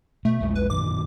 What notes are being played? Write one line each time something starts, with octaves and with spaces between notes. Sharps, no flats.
B2 A3
A#1 E2 G#3
B4
F#2 A#2 D#3 D6